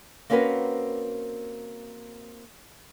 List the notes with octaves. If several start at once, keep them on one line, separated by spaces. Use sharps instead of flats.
A#3 C4 C#4 F#4 A#4 B4